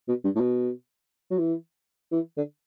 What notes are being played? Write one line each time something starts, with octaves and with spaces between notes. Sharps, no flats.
B2
G2
A2
B2
F#3
E3
E3
D3